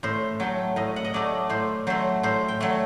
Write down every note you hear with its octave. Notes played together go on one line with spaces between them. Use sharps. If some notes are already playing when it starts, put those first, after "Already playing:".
A2 C5
F#3 A3 G5
A2 D#5
F#5
D#5
F#3 A3 D5
A2 C5
F#3 A3 C5
A2 C5
G5
F#3 A3